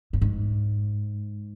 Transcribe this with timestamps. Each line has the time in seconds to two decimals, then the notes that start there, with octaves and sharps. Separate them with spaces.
0.13 G2
0.21 G#2